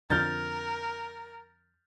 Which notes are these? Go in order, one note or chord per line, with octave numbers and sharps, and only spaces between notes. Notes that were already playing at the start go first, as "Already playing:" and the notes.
F2 D3 F3 A#4 F6 G6 A6